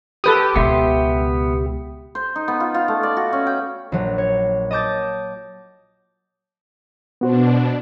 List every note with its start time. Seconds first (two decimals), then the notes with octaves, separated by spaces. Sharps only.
0.24 G4 A4 B4 D#6
0.56 C#2 B2 B3 E5 C6
2.15 C5
2.36 D#4
2.48 B3
2.60 F4
2.74 F4
2.88 A3
3.03 D5
3.17 F#4
3.33 C#4
3.47 G5
3.92 A#1 F#3
4.18 C#5
4.71 D#5 A5 D6 G6 A6
7.21 B2 B3 D4 F#4 C5